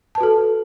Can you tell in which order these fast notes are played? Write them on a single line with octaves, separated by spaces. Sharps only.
A5 B4 F#4 A4